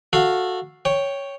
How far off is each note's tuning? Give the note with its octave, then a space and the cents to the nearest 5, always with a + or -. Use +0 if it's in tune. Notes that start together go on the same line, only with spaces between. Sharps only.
F#4 -10 A4 +0 F5 +0
C#5 +0 G5 +0